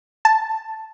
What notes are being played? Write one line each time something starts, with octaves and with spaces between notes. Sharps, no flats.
A5